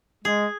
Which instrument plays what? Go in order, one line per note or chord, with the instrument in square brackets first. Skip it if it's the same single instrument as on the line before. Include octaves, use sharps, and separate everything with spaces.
[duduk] G#3 [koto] G#4